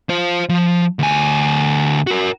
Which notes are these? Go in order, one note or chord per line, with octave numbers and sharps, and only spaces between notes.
F4 C5
F3
D2 G#5
F#4 A#4